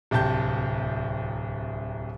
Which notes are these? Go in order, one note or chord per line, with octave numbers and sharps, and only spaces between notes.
D1 C2 G4 A5 G6